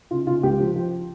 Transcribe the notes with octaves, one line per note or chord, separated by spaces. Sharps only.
C#3 F4
C#3 F4
C#2 G4
F3
F3